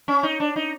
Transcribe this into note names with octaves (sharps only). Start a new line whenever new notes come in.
C#4
D#4
D4
D#4